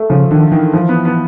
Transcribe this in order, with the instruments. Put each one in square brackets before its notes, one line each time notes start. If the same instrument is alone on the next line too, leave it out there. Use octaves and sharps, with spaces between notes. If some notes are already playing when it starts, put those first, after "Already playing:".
Already playing: [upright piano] A3
[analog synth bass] C#3 [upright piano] F3
[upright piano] D3 [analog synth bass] D#3
[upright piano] D#3 [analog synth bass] E3
[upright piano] F3
B3
B3